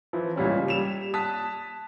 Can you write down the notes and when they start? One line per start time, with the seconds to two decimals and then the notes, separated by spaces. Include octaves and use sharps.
0.13 E3 F3
0.36 C#2 A#2 G3 C#4
0.68 G3 E7 F7
1.14 A5 D#6 F#6 B6